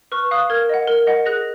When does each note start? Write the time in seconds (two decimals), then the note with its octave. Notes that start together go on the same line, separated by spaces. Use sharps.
0.12 B4 C#6 F6
0.31 F5 D#6 F#6
0.50 A#4 F6 G#6
0.69 D#5 F#5
0.88 A#4
1.07 D#5 F#5
1.26 G#4 F#6 A#6